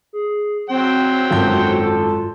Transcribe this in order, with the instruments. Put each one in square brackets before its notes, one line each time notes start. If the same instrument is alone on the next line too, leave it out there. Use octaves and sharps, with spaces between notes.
[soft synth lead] G#4
[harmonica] F#3 C5 G5 [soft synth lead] C4
[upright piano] G#1 F#2 G6 [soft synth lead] F4 [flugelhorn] A4